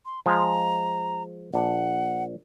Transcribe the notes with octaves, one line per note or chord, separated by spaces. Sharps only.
C6
F3 G#3 A#5
A#1 D4 F#5